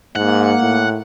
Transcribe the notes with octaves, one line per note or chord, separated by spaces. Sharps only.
G#2 A#3 F#5
A2